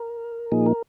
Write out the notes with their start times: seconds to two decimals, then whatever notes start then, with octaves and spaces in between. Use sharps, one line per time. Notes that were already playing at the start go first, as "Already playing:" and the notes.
Already playing: A#4
0.52 A#2 F3 A#3 D#4 G#4
0.66 A#4